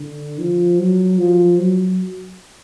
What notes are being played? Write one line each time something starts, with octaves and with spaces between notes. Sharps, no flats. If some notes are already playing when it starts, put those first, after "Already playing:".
Already playing: D3
F3
F#3
F3
F#3